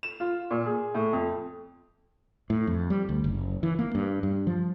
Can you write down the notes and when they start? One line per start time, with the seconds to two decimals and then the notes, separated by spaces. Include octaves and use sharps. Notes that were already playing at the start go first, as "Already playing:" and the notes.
0.03 E7
0.20 F4
0.51 A#2
0.66 G#4
0.95 A2
1.13 F2
2.50 A2
2.67 F2
2.90 G3
3.09 D2
3.24 F#1
3.63 E3
3.79 A#3
3.95 G2
4.23 G2
4.47 F3